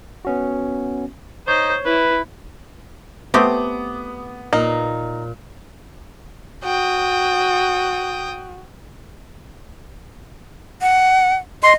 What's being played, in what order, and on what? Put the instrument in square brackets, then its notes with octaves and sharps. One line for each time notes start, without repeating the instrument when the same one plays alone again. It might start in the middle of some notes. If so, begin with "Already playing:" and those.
[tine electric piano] B3 C#4 F#4
[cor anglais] D#4 [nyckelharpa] C5 [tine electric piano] C#5 G6
[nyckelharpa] E4 [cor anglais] B4
[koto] A3 C4 G4 [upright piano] B3 D6 D#6
[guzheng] A#2 [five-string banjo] D#4
[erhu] F#4 [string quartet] G5 D#6
[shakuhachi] F#5
[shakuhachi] D#5 [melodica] C6